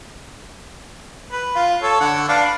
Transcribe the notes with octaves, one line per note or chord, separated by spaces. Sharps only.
B4
F4
A4 C#5
D3 F#5
D4 B4 F5